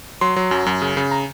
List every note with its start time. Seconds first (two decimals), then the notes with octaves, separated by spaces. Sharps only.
0.21 F#3 C6
0.36 F#3
0.51 F#2
0.66 F#2
0.82 C#3
0.97 C#3
1.11 A#5